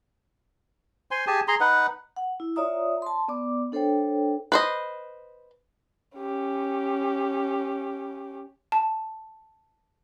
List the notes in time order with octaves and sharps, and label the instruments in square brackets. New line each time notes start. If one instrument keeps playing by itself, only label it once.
[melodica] C5 G#5 C6
G4 G#4 G#5 A5
G#4 A#5 C6
D#4 B4 F#5
[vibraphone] F#5
E4
F4 C#5 D5 E5 A#5 D#6
A5 C6
B3 D5 D6
D4 A4 C5 C#5 G5
[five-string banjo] B4 C5 D#5
[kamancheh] C#4 G4
[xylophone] A5